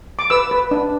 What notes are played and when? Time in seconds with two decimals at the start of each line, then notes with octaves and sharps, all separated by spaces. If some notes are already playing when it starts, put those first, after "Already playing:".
0.19 D6
0.30 B4 E6
0.51 B4
0.71 D4